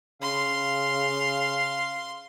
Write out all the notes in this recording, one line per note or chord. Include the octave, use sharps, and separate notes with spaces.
C#3 F5 C6